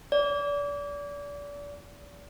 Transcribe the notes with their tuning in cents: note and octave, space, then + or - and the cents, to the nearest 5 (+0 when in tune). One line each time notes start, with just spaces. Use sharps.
D5 -35